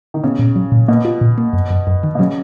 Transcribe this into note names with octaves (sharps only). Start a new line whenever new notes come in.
D#3
C#3 B3
A#2
F#3
A#2
B2 A#3
F4
A#2
A#3
F#2
F#2
F#2
D#3
B2
C#3 F#3